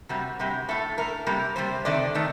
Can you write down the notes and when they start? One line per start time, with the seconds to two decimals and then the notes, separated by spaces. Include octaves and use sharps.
0.09 C3 G3 A#3 F#4
0.39 C3 G3 A#3
0.69 A2 A3 A4
0.97 A2 A3 A#4
1.26 C3 G3 A#3
1.56 C3 G3 A#3 C5
1.85 C3 D#3 A3 D5
2.14 C3 D#3 A3